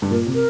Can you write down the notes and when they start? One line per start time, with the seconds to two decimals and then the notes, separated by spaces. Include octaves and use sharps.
0.02 G2
0.11 A#2 A#4
0.27 C3
0.34 A#4